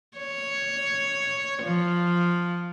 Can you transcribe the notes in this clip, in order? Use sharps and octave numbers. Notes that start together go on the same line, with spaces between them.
C#5
F3